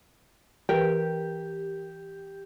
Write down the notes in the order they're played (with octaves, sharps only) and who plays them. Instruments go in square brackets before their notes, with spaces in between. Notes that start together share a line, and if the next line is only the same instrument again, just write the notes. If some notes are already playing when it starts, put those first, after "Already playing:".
[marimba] E3 B4 [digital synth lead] G4 [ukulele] A#4 G5